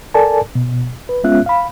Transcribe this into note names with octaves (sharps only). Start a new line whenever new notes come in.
A4 A#4 D5 G#5 A5
B2
B4
G#3 B3 C#4 F4 E5 F#6
F5 B5